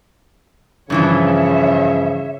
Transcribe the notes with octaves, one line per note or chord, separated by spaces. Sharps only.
G2 C#3 E3 F3 C#5 E5